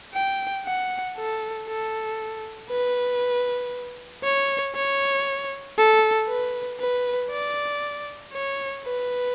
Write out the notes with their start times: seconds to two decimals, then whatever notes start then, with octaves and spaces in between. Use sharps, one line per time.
0.14 G5
0.65 F#5
1.17 A4
1.68 A4
2.70 B4
4.23 C#5
4.75 C#5
5.78 A4
6.29 B4
6.80 B4
7.31 D5
8.33 C#5
8.85 B4